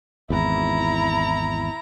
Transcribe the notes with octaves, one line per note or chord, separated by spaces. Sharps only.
G#1 E2 E4 A#5